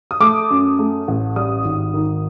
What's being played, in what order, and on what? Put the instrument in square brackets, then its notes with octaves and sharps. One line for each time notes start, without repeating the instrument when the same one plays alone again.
[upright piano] D#6
A3 D6
F#2
A3
A1
G3 D#6
G#1
D#3